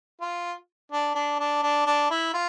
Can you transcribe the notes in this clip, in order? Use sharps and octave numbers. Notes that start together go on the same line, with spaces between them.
F4
D4
D4
D4
D4
D4
E4
F4